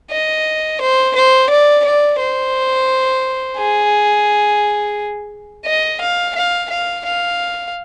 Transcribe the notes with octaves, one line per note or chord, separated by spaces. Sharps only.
D#5
C5
C5
D5
D5
C5
G#4
D#5
F5
F5
F5
F5